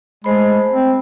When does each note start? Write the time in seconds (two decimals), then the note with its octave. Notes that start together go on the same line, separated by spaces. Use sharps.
0.24 G#3 A3 C5 B5
0.72 C4